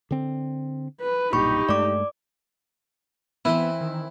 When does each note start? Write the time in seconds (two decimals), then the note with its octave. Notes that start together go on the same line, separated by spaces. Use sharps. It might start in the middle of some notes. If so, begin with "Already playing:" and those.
0.11 D3 C4
1.01 B4
1.33 B1 G2 A#2 D#4 G4 B5 C#6
1.69 G2 G#3 A3 D5 D6
3.45 E3 B3 C4 E4
3.80 D#3